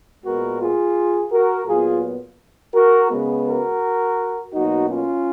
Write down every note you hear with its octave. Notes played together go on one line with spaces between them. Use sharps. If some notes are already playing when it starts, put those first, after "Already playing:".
A#2 G#3 B3 F#4 A#4
F4 G#4
F#4 A#4
A#2 F#3 B3 F4 G#4
F#4 A#4
C#3 G#3 B3
F#4 A#4
B2 F#3 A#3 D#4 F#4
C#4 F4